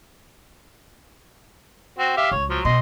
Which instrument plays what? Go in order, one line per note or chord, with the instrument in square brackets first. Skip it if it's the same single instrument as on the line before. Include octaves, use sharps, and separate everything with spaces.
[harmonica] C4 F#4
G4 E5 F5
[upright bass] C#2 [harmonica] C#5
[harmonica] F3 F#3
[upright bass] B2 [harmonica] D#5 C6